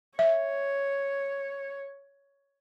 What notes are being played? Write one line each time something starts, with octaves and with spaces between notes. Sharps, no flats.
C#5 E5